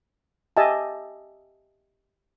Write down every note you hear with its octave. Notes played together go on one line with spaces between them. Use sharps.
G4 D#5 E5 G#5 A5